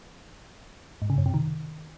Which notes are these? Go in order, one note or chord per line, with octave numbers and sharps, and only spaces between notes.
G#2
C#3
F#2
C3
D#3